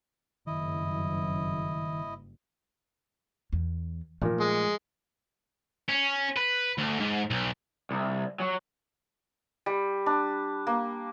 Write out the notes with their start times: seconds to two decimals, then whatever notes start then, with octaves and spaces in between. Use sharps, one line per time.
0.47 F#1 G2 D#3 E4 D#5
3.53 E2
4.22 A#2 F3 A3 D#4 A#4
4.40 G#3
5.89 C#4
6.37 B4
6.78 D2
6.99 G#2
7.30 B1
7.91 C2
8.40 F#3
9.66 G3
10.06 D4
10.67 A#3